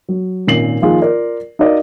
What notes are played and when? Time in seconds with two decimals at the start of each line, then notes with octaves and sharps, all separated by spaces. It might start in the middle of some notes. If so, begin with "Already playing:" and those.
0.09 F#3
0.47 G#1 A#2 C#4 C7 F#7
0.82 D#3 F3 A#3 D#4 F4 G#4
1.01 F4 A#4 D5
1.59 D#4 F#4 A#4 D5 D#5 F5